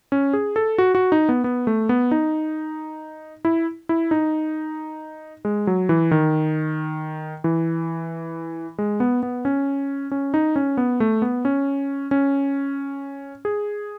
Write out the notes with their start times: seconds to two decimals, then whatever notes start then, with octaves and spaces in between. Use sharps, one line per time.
0.12 C#4
0.33 G#4
0.56 A4
0.78 F#4
0.95 F#4
1.12 D#4
1.29 B3
1.44 B3
1.67 A3
1.89 B3
2.11 D#4
3.45 E4
3.89 E4
4.11 D#4
5.45 G#3
5.67 F#3
5.89 E3
6.11 D#3
7.44 E3
8.78 G#3
9.00 B3
9.23 B3
9.45 C#4
10.11 C#4
10.34 D#4
10.56 C#4
10.77 B3
11.00 A3
11.22 B3
11.45 C#4
12.11 C#4
13.45 G#4